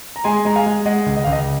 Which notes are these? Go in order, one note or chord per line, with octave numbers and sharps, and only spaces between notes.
A#5
G#3 G#5 C6
G#3 A#5
F5 G#5
G#3
G#3 D#5 F#5
C#2
D#5
C#2 F5
D#5